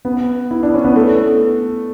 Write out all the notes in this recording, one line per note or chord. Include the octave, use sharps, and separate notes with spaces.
B3
E4
D4
C#4
B3
A3